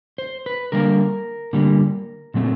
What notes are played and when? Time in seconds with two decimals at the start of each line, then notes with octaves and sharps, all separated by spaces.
0.18 C5
0.46 B4
0.72 D3 G3 A#3 A#4
1.53 D3 G3 A#3
2.34 A#2 F#3 A3 C4